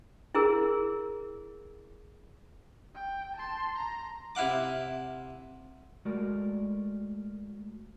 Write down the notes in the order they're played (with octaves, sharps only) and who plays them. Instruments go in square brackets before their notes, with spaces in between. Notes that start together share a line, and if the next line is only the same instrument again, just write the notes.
[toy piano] E4 G#4 A#4
[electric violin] G5
A5 C6
A#5
[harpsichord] C3 E4 F5 F#5 D6
[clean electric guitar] G#3 A3 F#4 A#4 D5